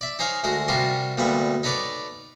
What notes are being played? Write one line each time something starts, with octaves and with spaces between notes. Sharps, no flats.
D5 E5
D#4 G#4 C5 C#5 F5
D2 G#3 F#4 A#4
C3 G3 D4 F4 F#4 A#4
D2 A#2 G3 B3 F#5 C#6
D#4 A4 B4 C#5 D5 D6